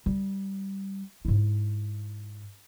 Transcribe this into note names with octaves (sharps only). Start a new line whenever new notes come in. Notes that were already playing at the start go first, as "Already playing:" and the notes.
G3
G#2 E4